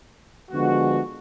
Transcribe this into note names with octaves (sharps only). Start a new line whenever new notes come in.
D3 F3 G#3 B3 F#4